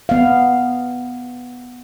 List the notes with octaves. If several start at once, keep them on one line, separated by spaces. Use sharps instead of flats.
B3 F5